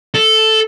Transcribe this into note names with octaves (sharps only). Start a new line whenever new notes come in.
A4